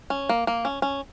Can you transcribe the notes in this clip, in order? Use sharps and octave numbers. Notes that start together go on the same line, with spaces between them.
C#4
A#3
A#3
C#4
C#4